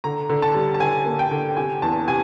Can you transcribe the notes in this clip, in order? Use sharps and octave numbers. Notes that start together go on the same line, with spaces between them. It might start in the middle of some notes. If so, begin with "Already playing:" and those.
D3 A#5
D3
A5
G3
A5
D3 G#5
A#3
G5
D3
C3 G#5
E2 A5
C3 G#5